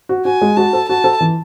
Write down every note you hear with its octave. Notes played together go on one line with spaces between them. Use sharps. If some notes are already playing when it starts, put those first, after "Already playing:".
F#4
F#4 G#5
G#3
F#4 A5
A4
F#4 A5
A4
E3